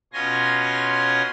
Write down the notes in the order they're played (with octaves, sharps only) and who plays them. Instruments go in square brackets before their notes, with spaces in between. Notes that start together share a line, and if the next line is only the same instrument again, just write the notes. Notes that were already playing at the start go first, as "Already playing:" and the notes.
[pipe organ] B2 C#4 F4 G#5 C6 A#6